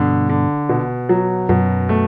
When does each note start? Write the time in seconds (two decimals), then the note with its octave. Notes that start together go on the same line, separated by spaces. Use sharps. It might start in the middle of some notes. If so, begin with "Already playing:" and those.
Already playing: G2 B2 D3
0.29 D3
0.69 B2
1.09 F#3
1.49 F#2 B2
1.89 A3